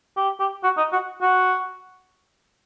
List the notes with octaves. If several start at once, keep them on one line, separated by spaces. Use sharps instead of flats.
G4
G4
F#4
D#4
F#4
F#4